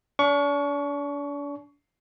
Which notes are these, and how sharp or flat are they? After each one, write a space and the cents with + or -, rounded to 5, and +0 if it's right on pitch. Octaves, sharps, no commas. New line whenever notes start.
D4 -40 C#6 +20